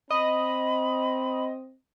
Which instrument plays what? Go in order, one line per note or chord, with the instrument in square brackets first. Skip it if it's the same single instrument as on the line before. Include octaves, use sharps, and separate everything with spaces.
[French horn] C4 [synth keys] D#5 [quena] B5